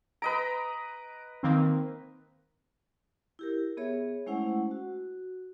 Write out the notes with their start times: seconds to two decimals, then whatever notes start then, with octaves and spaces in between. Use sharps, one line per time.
0.22 B4 D#5 A#5 D7
1.43 D#3 A#3 C4
3.39 E4 G4 A#4
3.77 B3 G#4 C#5 E5
4.27 G#3 A3 C#4 E4 C5 F#5
4.71 F#4